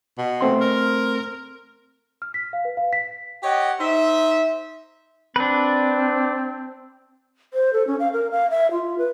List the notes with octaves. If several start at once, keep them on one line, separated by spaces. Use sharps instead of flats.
B2
A3 C4 C6
A#4
F6
B6
F5
B4
F5
B6
G4 C#5 D#5 F#5 G5
D#4 C5 E5
C4 D4 B4
C5
A4
C#4
F5
A#4
F5
E5
F4
B4